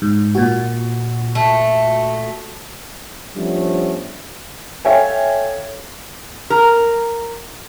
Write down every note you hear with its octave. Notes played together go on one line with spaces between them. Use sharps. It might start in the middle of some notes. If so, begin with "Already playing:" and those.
G#2
A#2 F#4
A3
F3 G3 A3 B3 C#4 D4
A4 C#5 E5 F5 G5 G#5
A#4